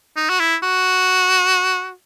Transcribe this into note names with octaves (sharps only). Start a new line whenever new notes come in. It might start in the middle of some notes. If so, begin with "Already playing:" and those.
D#4
F#4
E4
F#4